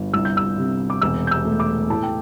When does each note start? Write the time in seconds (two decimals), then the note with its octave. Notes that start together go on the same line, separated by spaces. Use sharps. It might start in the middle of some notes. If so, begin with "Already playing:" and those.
Already playing: G1
0.13 C2 E6
0.25 G6
0.37 E6
0.57 C3
0.90 D6
1.02 E1 E6
1.27 G6
1.31 E6
1.45 A3
1.60 D6
1.90 A2 A5
2.03 G5